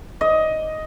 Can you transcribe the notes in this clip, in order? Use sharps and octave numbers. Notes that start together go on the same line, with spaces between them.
D#5